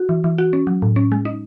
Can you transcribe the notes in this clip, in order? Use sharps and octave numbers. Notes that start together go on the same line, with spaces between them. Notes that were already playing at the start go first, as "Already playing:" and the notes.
Already playing: F#4
E3
E3
F#4
C#4
F#3
A2
C#4
G#3
D#4